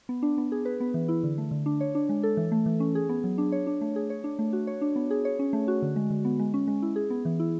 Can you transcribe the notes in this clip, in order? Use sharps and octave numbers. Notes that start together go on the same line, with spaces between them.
B3
D4
B3
G#4
B4
B3
E3
E4
D3
A3
D3
D4
C#5
D4
G#3
A4
E3
A3
E3
C#4
G#4
B3
F#3
D4
C#5
D4
A3
G#4
C#5
D4
A3
F#4
C#5
D4
B3
G#4
C#5
C#4
A3
F#4
D3
G#3
D3
B3
G#3
C#4
G#3
E4
G#4
B3
E3
E4